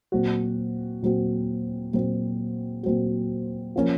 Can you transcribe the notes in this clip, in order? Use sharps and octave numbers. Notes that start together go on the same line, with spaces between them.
A#2 F#3 C4 F#4
A#2 F#3 C4 F#4
A#2 F#3 C4 F#4
A#2 F#3 C4 F#4
F3 A#3 C#4